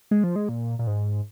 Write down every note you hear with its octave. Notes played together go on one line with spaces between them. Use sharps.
G#3
F3
G#3
A#2
A#2
G#2